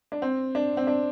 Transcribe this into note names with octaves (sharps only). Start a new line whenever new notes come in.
D4
C4
D4
C4
D4